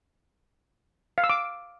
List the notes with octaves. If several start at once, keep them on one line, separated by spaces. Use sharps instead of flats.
F5
E6
D6